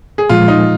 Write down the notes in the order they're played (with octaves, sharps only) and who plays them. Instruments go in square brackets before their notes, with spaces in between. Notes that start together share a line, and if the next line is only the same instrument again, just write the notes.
[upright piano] G#4
[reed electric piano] A#2 F3 G#3 [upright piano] F4
[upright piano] D#4